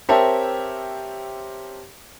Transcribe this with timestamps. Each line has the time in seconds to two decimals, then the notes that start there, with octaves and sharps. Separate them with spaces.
0.09 C4 G4 A#4 C#5 E5 A5